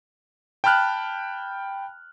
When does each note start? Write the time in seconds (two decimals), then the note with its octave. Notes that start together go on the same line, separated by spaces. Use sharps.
0.64 G5 A5 B5 F6 F#6